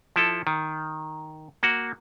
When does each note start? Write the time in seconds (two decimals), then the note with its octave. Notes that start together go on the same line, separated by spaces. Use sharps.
0.16 F3 E4 A4
0.47 D#3
1.63 A#3 F#4